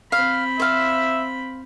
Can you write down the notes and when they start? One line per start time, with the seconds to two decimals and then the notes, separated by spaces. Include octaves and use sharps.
0.12 C4 F5 B5
0.60 C5 E5 F5